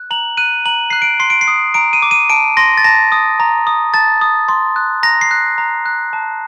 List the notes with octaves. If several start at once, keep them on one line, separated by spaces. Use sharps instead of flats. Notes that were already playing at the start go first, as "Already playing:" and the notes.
Already playing: F#6
A#5 F#7
F#6 D#7
A#5 F#7
F#6 C7
D7
C6 C7
D7
C7
D#6
A#5 D7
D#7
D6
D#7
A5 D7
C6 A#6
A6
A5 A#6
D#6
A#5
D#6
A5 A6
D#6
C6
F#6
A#5 A#6
C7
F#6
A#5
F#6
A5